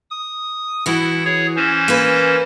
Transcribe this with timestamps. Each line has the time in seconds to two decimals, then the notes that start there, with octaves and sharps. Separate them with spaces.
0.10 D#6
0.86 E3 E4 F#4
1.25 G#4 C#5
1.56 E3 C#4 C5
1.88 A#3 B4